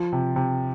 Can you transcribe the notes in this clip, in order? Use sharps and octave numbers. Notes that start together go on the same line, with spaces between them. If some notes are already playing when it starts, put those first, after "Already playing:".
Already playing: F3
C3
C3